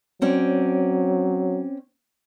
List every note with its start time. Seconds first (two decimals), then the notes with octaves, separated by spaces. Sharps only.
0.22 F#3 C4 C#4 D5